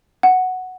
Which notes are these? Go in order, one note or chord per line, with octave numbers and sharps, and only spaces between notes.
F#5